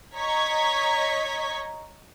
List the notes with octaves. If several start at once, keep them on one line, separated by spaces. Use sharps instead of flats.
C#5 D#5 A#5 C#6 G#6 B6